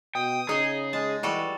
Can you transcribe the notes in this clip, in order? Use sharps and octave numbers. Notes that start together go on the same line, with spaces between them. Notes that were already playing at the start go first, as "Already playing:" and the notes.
B2 G5 D#6
C#3 D#4 G#4 D#5
G#3 A5
E3 G3 F#4 A4